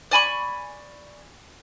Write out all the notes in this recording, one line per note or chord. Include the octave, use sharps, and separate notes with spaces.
D5 G#5 B5 C#6